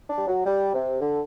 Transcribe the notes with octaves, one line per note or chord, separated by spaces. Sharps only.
D4
G3
F#3
G3
C3
D3